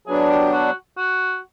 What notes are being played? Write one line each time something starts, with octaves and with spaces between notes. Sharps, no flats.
F#3 B3 D4 G#4
G4
F#4
F#4